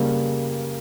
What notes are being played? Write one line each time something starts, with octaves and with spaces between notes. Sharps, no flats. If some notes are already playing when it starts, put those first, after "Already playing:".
Already playing: C#3 G3 A#3